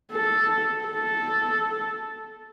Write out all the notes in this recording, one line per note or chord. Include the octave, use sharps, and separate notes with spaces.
A4
A4